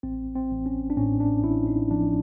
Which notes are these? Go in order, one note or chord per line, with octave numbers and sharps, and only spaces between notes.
A1 C4
C4
A1
C#4
D4
A2 C#4
D4
A1 E4
D#4
F3 D4